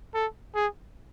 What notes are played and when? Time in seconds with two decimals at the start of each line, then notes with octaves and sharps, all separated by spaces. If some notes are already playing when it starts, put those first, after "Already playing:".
0.14 A4
0.55 G#4